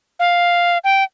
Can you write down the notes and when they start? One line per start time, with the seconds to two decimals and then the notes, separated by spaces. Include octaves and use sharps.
0.20 F5
0.84 G5